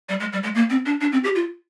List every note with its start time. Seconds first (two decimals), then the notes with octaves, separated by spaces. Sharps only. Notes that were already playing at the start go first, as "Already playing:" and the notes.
0.09 G3
0.20 G#3
0.33 G3
0.43 G#3
0.55 A#3
0.70 C4
0.86 D4
1.01 D4
1.12 C4
1.24 G4
1.35 F4